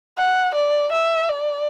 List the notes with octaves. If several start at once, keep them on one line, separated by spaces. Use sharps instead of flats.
F#5
D5
E5
D5